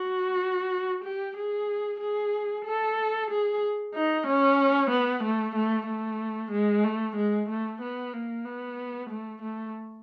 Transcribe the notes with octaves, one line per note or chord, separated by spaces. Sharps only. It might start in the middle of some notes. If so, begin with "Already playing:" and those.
Already playing: F#4
G4
G#4
G#4
A4
G#4
D#4
C#4
B3
A3
A3
A3
G#3
A3
G#3
A3
B3
A#3
B3
A3
A3